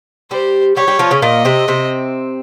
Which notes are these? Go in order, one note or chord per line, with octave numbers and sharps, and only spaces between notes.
G3 G4 C5
G3 G4 C#5
G3 G4
F3 F4
C#3 C#4
A#2 A#3 D#5
C3 C4
C3 C4